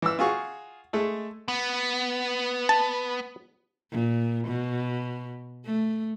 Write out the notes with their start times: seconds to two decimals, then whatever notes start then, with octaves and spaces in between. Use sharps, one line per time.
0.02 E3 E6
0.19 F4 F#4 G#4 C#6
0.93 G#3 A3 A4
1.48 B3
2.69 A5
3.91 A#2
4.47 B2
5.65 A3